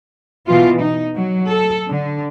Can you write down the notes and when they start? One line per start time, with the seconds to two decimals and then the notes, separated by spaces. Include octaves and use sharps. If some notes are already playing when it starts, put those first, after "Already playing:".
0.47 B2 E3 F4
0.80 D#4
1.16 F#3
1.47 A4
1.89 D3